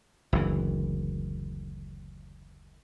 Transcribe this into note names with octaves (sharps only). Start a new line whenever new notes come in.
F#1 D2 E3